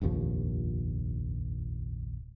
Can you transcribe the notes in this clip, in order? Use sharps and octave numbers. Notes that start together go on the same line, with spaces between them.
F1 A#1 D#2 F3